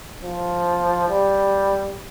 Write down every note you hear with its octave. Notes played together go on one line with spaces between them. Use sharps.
F3
G3